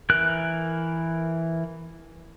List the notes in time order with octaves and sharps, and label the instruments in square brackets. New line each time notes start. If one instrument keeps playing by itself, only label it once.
[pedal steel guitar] E3 A#4 F#6